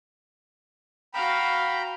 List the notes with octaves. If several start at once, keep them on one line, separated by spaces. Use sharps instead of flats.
F#4 F5 G5 A#5 B5